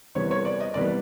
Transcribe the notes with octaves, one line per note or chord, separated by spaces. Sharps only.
C3 E3 G3 B3 C#5
C#5
D5
D#5
C3 E3 G3 B3 D5